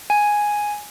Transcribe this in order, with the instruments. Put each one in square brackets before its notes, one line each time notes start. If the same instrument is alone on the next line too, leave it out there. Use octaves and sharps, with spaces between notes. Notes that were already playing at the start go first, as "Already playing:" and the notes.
[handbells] G#5